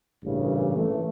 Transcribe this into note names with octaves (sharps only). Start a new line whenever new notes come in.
A1 G2 A#2 C#3 E3
E3 A3